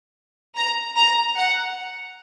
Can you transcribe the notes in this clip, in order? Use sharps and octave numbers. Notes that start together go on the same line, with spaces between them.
A#5
A#5
F#5